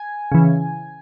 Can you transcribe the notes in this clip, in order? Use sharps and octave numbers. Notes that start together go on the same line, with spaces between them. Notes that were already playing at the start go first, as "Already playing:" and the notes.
Already playing: G#5
C#3 E3